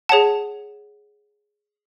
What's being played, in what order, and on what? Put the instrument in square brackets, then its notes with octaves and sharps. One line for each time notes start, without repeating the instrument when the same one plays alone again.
[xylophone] G#4 C#5 F#5 A5